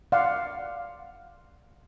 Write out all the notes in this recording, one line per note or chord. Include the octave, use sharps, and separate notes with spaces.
D5 F5 F#5 C6